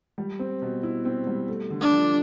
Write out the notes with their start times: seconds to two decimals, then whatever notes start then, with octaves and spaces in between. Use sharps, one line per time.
0.18 G3
0.39 C4
0.62 B2
0.83 E4
1.05 C4
1.27 G3
1.49 A3
1.70 D3
1.81 D4
1.92 F3